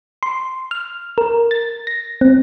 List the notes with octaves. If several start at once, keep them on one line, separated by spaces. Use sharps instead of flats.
C6
F6
A#4
A6
A#6
C4